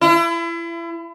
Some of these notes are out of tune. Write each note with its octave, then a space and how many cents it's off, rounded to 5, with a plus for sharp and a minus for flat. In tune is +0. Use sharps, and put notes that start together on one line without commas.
E4 +35